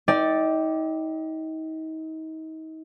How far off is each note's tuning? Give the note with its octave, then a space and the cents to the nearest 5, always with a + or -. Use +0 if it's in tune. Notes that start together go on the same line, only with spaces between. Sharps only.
D#4 +35 D5 +0 G5 +0